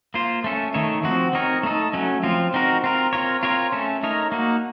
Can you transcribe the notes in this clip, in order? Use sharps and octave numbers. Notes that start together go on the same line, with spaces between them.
A#3 F4 C5
A3 C#4 A4
D#3 A3 D#4 A4 C#5
F3 C4 F#4
C4 D#4 A#4 C#5
A3 D#4 A4
F#3 A3 C#4
F3 C4 F4
C4 D#4 F#4 A#4
C4 F4 A#4
C4 F4 A#4 C#5
C4 F4 A#4 C#5
A3 C#4 A4
A3 D#4 A#4 C#5
A#3 D#4 F#4